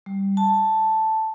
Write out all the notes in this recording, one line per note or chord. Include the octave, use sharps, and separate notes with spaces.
G3
A5